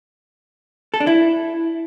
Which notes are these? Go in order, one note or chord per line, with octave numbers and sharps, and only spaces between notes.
A4
D4
E4